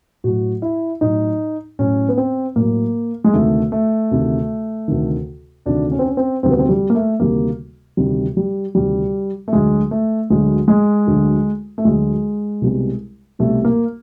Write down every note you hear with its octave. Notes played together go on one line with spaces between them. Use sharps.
A2 F#3 F#4
E4
A2 F#3 D#4
A2 F#3 C#4
B3
C4
A2 F#3 A#3
G#3
D2 C3 D#3 A3
A3
D2 C3 D#3
D2 C3 D#3
D2 C3 D#3 D4
C#4
C4
C#4
C4
D2 C3 D#3 G3 C4
B3
C4
G3
A#3
A3
D2 C3 D#3 G3 A#3
D2 C3 D#3 G3
G3
D2 C3 D#3 G3
A3
D2 D3 F#3 G#3
A3
D2 D3 F#3 G#3
G#3
D2 D3 F#3
A3
D2 D3 F#3 G#3
C2 B2 G3
C2 B2 G3 A3
A#3